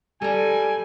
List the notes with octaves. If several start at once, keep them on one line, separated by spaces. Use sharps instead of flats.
G3 A4 G#5 A#5